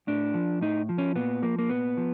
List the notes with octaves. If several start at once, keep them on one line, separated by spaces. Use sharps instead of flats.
A2 D4
F3
A2 D#4
F3
C#4
A#2 B3
F3 A#3
A#3
A#2 B3
F3